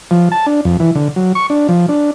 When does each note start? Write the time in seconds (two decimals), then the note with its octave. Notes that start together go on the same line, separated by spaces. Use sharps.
0.11 F3
0.32 A5
0.47 D4
0.65 F2
0.80 E3
0.95 D3
1.16 F#3
1.35 C#6
1.50 D4
1.69 F3
1.89 D4